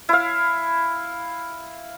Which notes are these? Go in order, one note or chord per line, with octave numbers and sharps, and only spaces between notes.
E4 F5